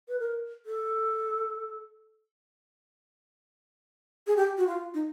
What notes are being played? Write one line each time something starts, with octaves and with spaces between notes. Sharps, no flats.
B4
A#4
A4
G#4
G4
F#4
F4
D#4